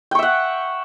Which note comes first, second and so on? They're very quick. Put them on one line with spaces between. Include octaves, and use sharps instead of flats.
G5 C#6 E5 F#5